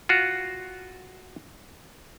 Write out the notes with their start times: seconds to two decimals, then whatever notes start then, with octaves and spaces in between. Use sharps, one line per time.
0.09 F4 F#4